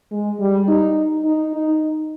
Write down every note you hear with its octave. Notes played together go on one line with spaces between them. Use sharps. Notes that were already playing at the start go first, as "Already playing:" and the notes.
G#3
G3
D#4
D#4
D#4